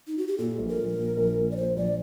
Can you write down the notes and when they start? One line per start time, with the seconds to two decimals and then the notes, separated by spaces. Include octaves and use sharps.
0.07 D#4
0.18 F#4
0.28 G4
0.38 A#2 A4
0.58 A#1
0.68 A#4
0.78 A#1
0.98 A#2
1.17 A#1
1.37 A#2
1.51 D5
1.56 A#2 C5
1.77 A#1 D5